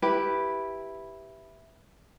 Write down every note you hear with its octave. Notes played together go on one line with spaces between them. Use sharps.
E4 G4 B4